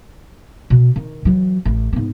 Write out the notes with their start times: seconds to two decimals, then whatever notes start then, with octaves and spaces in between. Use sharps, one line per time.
0.70 B2
0.96 D#3
1.25 E3 F#3
1.65 A1
1.93 G#2 B3